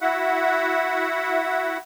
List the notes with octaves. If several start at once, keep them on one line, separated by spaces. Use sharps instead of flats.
E4 F#4 E5 F#5